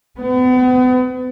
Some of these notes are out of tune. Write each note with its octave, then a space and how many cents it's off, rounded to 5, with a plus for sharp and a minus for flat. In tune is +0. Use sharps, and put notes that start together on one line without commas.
B3 +40